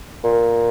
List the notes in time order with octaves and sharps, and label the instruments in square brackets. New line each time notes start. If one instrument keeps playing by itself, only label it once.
[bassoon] A#2